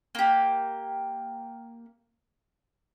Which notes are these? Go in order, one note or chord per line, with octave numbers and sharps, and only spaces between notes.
A#3 G4